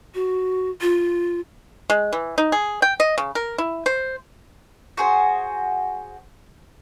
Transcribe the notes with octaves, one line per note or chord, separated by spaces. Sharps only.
F#4
F4
G#3
E3
D#4
G#4
G5
D#5
C#3
A#4
E4
C5
F#4 G#4 C5